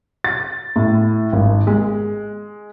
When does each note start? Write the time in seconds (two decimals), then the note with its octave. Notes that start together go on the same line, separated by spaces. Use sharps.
0.24 A6
0.76 A2
1.33 G#1
1.67 G#3